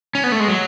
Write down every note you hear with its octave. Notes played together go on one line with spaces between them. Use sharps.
C#4
B3
A3
G#3
F#3